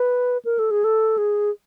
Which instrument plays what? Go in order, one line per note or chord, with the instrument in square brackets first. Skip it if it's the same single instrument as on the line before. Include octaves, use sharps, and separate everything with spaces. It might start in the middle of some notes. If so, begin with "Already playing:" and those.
Already playing: [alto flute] B4
A#4
A4
G#4
A4
G#4